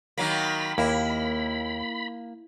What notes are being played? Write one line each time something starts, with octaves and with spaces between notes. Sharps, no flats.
D#3 F#3 A#3 B5
D#2 A#3 E4